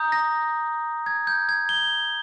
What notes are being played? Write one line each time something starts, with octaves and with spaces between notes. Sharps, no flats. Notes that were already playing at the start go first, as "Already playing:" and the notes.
Already playing: A#5 D#6 G6
A#6
G#6
G6
G#6
G7